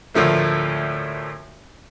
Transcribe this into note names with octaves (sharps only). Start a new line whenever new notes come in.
D2 A2 F3 A3 A#3